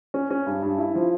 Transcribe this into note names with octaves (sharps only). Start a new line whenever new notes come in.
C#4
C#4
G2
G2
E4
F3